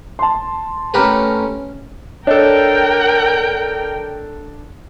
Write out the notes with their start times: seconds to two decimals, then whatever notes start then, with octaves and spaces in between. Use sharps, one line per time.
0.19 A5 C6
0.94 A3 B3 C#4 G4 A#4 B4
2.27 D4 A4 A#4 C#5 D#5 G5